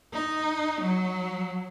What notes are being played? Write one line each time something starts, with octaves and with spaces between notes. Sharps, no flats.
D#4
F#3